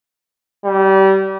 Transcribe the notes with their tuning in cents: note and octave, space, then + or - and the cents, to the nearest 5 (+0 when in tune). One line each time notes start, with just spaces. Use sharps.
G3 -30